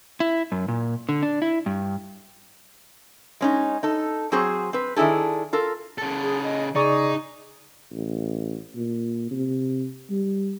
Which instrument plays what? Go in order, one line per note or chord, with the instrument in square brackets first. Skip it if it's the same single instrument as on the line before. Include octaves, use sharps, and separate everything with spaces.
[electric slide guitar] E4
F#2
A#2
D3
D4
E4
G2
[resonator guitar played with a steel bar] G#3 C#4 D#4
D#4 A4
F#3 C4 F#4 G#4 C5
C4 B4
D#3 D4 E4 G#4 A4
F4 A4 A#4
[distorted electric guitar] C#3 A4
[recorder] G#4
D#5
[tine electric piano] C#3 D5 C#6 [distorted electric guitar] D#4 [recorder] G#4
[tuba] A1
A#2
C3
G3